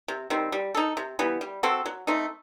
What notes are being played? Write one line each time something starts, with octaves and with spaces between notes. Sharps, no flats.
C3
D#3 G3 C4
G3
D#4 A4
C3
E3 G3 B3
G3
C4 F#4 A4
F#3
A3 C4 D#4